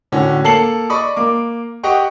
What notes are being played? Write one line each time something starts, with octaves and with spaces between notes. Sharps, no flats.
A2 D3 C#4 F#4
A#3 A4 A5 C7 C#7 F#7
D5 D#5 B5 C#6 D#6
A#3 D6
G4 D#5 F#5 G5 C#6